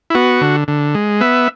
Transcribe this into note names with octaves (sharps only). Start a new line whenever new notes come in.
E4
B3 F#4
D3
D3
G#3
B3 E5